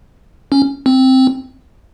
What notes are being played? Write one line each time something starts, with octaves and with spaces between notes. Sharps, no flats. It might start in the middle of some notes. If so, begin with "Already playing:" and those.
C#4
C4